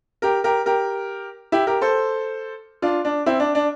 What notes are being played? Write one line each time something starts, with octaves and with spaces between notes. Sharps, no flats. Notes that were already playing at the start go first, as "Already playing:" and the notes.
G4 A#4
G4 A#4
G4 A#4
E4 G4
G4 A#4
A4 C5
D4 F4
D4
C4 E4
D4
D4